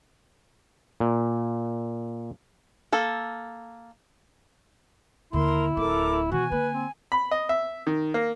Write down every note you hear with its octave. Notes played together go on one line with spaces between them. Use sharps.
A#2
A#3 A4
D#2 D3 E4 A#4 C6
D1 F4 A4 A#4 D6
B2 E3 F#4 G#5
D3 A#3 B4
C4
B5
D#5
E5
D#3
A#3